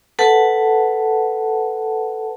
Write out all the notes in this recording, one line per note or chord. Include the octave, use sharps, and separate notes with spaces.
A4 B4 F#5 A5